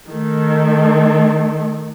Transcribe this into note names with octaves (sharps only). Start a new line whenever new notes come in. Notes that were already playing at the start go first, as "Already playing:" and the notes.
D#3 A3